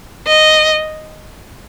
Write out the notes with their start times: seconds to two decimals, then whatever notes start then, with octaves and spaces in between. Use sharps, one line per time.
0.27 D#5